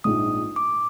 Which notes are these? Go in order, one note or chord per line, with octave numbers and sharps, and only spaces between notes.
A#1 G#2 F3 G#3 D#6
D6